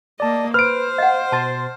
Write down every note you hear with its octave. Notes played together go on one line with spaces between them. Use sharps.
A#3 D5 D#5 A5
B4 C5 F6 D7
D#5 F5 F#5
B2 A5 C6 A6